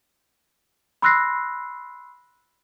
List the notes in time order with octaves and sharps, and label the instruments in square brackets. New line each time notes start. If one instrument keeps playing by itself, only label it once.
[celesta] B5 C6 E6 F#6 A#6 C7